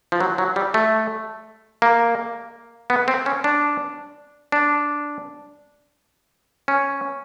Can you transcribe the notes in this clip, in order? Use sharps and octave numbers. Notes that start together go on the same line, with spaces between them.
F3
F#3
F#3
G3
A3
A#3
B3
C4
C#4
D4
D4
C#4